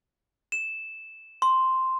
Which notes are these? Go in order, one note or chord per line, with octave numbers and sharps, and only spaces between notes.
E7
C6